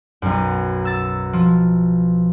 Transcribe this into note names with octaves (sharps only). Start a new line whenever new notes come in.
B1 F#2
E6 A6
F3